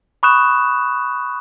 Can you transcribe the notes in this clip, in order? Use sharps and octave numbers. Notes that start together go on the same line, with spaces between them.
B5 C#6 D#6 F#6 E7